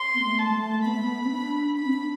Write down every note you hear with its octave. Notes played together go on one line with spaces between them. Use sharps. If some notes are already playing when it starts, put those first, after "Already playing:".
Already playing: C6
B3
A3
A5
G3
A3
B3 B5
A3
B3
C4
D4
D4 B5
C4
D4